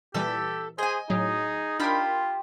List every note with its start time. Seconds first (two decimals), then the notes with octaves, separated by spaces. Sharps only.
0.14 A#2 E3 G3 G4 A4 E5
0.78 G#4 C5 D#5 G#5
1.10 A2 F#3 D#4 G#4
1.80 D4 F4 G4 A#4 C5 B5